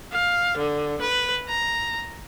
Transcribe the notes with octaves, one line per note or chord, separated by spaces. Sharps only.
F5
D3
B4
A#5